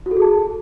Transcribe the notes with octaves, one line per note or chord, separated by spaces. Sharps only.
F#4
A4
G#4
A5